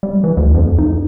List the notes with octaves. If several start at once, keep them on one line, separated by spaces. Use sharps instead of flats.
G3
E3
D2
F2
D#4